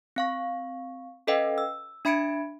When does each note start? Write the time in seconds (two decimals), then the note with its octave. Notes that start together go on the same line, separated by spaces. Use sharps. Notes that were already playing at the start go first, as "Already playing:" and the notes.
0.16 C4 F5 C#6
1.27 C#4 A4 B4 D#5 F5 G5
1.58 E6
2.05 D4 E5 B5 G#6 C#7 D7